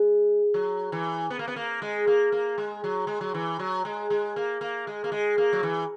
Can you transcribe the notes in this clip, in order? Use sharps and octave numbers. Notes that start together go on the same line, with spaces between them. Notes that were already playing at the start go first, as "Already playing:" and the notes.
Already playing: G#3
F#3
E3
B3
A#3
B3
A#3
G#3
A#3
A#3
G#3
F#3
G#3
F#3
E3
F#3
G#3
G#3
A#3
A#3
G#3
A#3
G#3
A#3
F#3
E3